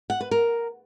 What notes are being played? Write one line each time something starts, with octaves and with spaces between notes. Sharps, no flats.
F#5
B4
A#4